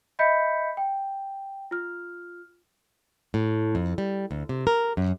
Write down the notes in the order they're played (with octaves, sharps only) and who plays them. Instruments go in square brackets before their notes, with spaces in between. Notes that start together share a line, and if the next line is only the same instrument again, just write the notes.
[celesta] D#5 E5 B5 G6 B6 C#7
G5
F4 F6
[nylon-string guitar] A2
F2
G3
D2
C3
A#4
F#2